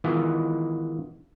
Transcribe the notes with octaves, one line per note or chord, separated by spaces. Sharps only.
D#3 E3 G#3 B3 E4 F4